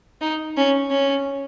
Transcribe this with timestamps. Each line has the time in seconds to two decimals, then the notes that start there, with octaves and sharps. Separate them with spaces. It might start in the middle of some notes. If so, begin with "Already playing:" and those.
0.21 D#4
0.57 C#4
0.91 C#4